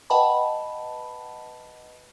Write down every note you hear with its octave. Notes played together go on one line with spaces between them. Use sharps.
B4 D#5 F#5 G5 A5 B5